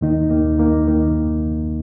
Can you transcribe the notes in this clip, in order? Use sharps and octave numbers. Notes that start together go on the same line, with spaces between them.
D#2 D#3 A#3 D#4
D#2 D#3 A#3 D#4
D#2 D#3 A#3 D#4
D#2 D#3 A#3 D#4